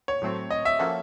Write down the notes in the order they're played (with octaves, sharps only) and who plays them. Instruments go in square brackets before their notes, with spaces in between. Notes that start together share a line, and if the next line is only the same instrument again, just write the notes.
[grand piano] C#5
[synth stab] A2 F#3 A3 C4
[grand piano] D#5
E5
[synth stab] F3 A#3 C#4 F#4 A4